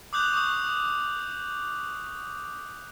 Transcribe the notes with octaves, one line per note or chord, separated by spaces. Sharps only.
D6 D#6 F#6 G6 F7 F#7
C#6 D#6